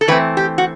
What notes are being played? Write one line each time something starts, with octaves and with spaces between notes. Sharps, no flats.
A4
E3 A3 C4 B4
G4
F#4